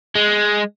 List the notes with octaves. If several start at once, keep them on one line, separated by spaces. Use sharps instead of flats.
G#3